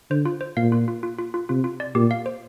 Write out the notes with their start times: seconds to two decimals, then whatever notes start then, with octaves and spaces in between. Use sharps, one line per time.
0.10 D3 C5
0.25 F4
0.41 C5
0.56 A#2 F5
0.72 F4
0.88 F4
1.03 F4
1.18 F4
1.34 F4
1.49 C3 F4
1.64 F4
1.80 D5
1.95 A#2 G4
2.11 F5
2.26 C5